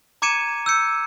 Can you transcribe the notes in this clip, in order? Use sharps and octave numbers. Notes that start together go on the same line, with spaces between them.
A#5 D6 G#6 C#7 D#7 E7
E6 G6 C#7